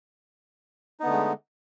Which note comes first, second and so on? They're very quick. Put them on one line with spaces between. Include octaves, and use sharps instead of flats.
D#4 B3 D3 A3 G#3